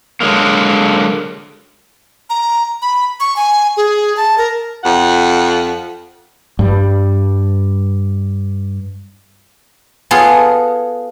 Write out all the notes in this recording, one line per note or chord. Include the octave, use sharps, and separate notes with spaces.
D3 F#3 G#3 A#3
A#5
B5
C#6
G#5
G#4
A5
A#4
F2 F#5
G2 G3
B3 F4 G#4 A4